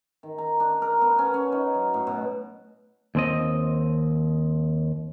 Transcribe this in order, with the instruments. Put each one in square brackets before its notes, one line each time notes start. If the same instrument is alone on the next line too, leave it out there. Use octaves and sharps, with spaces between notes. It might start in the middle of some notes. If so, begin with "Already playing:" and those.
[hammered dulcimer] D#3
A#5
D4
A#4
B3
C#4
C#4
D#4
F#3
A2
B2
[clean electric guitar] D#2 C4 D#5